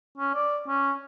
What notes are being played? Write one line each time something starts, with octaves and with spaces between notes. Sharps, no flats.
C#4
D5
C#4